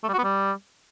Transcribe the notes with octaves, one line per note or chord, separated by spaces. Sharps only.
A3
G3
F#4
B3
G3